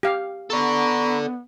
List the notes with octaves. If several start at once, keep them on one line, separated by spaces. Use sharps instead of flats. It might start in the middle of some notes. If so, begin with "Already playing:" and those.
G4 F5
B3 A4 D5 A#5 B5 C#6